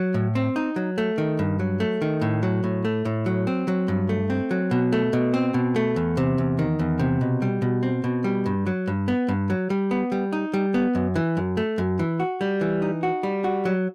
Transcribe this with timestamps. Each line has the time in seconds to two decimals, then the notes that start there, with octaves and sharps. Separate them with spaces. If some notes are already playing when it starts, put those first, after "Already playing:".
Already playing: F#3
0.14 A2
0.35 C4
0.56 D#4
0.76 F#3
0.98 A3
1.18 D#3
1.39 G2
1.59 F#3
1.80 A3
2.02 D#3
2.21 A2
2.43 F#3
2.64 A2
2.85 A3
3.05 A2
3.26 F#3
3.47 C4
3.68 F#3
3.88 G2
4.09 A3
4.30 C4
4.51 F#3
4.71 B2
4.93 A3
5.13 B2
5.34 C4
5.54 B2
5.76 A3
5.96 E2
6.17 C3
6.38 E2
6.59 D#3
6.79 E2
6.99 C3
7.21 B2
7.42 G3
7.62 B2
7.83 C4
8.04 B2
8.24 G3
8.46 G2
8.66 F#3
8.87 G2
9.08 B3
9.28 G2
9.50 F#3
9.70 G3
9.91 B3
10.12 G3
10.33 D#4
10.54 G3
10.74 B3
10.95 F#2
11.16 E3
11.37 F#2
11.57 A3
11.78 F#2
11.99 E3
12.20 F#4
12.41 G3
12.61 E3
12.82 D#4
13.03 F#4
13.23 G3
13.44 F#4
13.65 F#3